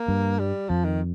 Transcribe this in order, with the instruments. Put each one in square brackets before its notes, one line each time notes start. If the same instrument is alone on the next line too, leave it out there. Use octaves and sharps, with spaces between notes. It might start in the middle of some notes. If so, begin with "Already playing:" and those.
Already playing: [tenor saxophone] A#3
[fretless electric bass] G2
[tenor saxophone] G3
[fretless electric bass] F2 [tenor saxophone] F3
[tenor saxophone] D#3